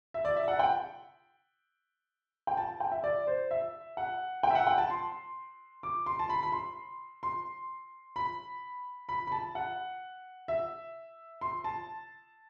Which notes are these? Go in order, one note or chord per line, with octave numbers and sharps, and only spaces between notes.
E5
D5
E5
F#5
G5
G5
A5
G5
E5
D5
C5
E5
F#5
G5
E5
F#5
G5
A5
C6
D6
C6
A5
B5
B5
C6
C6
B5
B5
B5
A5
F#5
E5
C6
A5